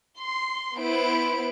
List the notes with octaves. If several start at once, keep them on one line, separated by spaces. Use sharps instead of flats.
C6
B3 E4 B4 C5 D7